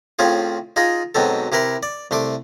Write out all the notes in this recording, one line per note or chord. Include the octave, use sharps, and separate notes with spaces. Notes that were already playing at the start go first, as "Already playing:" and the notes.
A2 C4 C#4 F4 G#4
D#4 F4 G#4 D#5
G#2 B2 F#3 C4 A4
C3 E4 A#4 B4 C6
D5
C2 A3 C6 D6